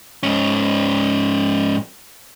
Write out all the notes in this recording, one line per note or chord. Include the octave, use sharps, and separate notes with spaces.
G#2 C#4